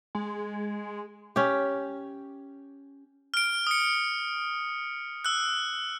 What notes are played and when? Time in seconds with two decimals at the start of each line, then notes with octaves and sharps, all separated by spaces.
0.15 G#3
1.36 C#4 G4
3.34 F6 D7
3.67 D#6 C#7
5.25 E6 F#6